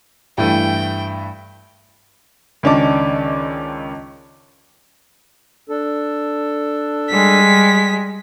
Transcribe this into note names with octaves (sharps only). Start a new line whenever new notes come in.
G2 E3 A3 G5
C#2 D#3 C#4 D4 A5 D6
D4 A4
G3 G#3 B6